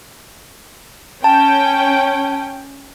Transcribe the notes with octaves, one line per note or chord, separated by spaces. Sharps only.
C#4 G5 A5